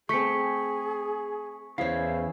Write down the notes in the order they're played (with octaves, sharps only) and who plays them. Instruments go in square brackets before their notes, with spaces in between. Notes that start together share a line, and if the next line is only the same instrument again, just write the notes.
[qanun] A3 C4 [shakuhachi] G#4 [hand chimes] C#6 B6 C#7
[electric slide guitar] E2 G#4 F5 [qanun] C#4 E4 [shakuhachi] C5